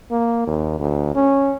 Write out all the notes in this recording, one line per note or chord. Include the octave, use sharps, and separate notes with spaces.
A#3
D#2
D2
C#4